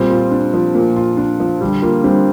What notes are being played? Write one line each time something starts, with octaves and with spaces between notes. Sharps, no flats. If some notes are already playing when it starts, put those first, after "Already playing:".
Already playing: A#2 G3 C4
F4
D4
F3
A#2 A#3
F4
D4
F3
D3 G3
A#3 F4
G3 C4 D4